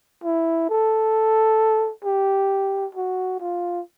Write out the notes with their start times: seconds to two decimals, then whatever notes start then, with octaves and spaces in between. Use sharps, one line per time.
0.24 E4
0.69 A4
2.05 G4
2.95 F#4
3.40 F4